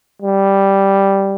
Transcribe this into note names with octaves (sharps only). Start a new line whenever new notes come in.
G3